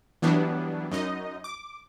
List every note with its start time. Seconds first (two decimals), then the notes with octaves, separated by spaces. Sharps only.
0.22 E3 F#3 G3 B3 D4
0.91 F#2 D#4 D#5
1.44 D6